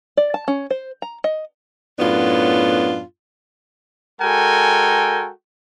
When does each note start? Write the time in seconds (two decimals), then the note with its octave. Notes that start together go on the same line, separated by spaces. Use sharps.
0.17 D5
0.34 A5
0.48 C#4
0.70 C5
1.02 A#5
1.24 D#5
1.99 F#2 A2 F#3 B3 D4 F4
4.21 G#3 F#4 A4 A#4 G5 G#5